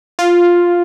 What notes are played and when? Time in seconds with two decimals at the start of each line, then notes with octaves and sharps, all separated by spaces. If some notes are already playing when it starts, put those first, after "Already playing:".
0.19 F4